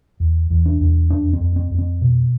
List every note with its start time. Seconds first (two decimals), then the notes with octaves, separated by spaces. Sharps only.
0.20 E2
0.50 E2
0.66 D4
0.81 E2
1.10 F2 D4
1.33 C4
1.41 F2
1.56 C4
1.71 F2
1.78 C4
2.01 B2